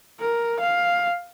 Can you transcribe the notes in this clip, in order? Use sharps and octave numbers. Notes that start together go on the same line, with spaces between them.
A#4
F5